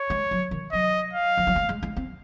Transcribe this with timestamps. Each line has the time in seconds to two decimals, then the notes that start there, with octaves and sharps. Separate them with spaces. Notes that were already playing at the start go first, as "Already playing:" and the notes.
Already playing: C#5
0.10 G#3
0.31 F#3
0.51 D#3
0.72 F#3 D#5
1.14 F5
1.37 F3
1.47 F#3
1.56 G#3
1.69 G#3
1.83 G#3
1.97 C4